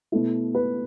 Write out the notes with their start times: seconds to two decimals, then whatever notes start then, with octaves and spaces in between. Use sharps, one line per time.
0.12 B2 A3 E4
0.55 B4